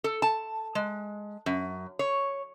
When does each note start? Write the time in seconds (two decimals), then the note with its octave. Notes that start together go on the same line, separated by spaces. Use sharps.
0.04 A4
0.22 A5
0.75 G#3
1.46 F#2
1.99 C#5